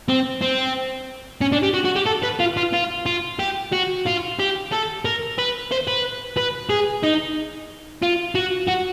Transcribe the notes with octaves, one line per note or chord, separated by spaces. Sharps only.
C4
C4
C#4
D4
G4
F#4
F#4
G4
A4
B4
F4
F4
F4
F4
G4
F#4
F4
G4
A4
A#4
B4
C5
B4
B4
G#4
D#4
F4
F#4
F#4